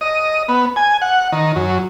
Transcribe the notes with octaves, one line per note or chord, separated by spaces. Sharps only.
D#5
B3
G#5
F#5
D#3
F#2